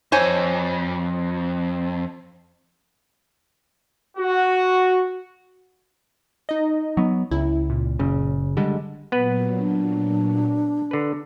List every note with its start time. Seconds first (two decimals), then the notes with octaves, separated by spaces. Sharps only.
0.12 F2 C5 C#5 G#5
4.17 F#4
6.49 D#4 D#5
6.97 F#3 B3
7.31 C#2 E4
7.70 A#2
7.99 F#1 C#3
8.57 D3 G3 G#3
9.12 A#2 F#3 B3 B4
9.58 D4
10.91 D3 B4